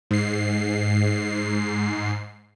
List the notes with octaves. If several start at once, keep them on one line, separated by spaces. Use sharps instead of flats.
G#2 C7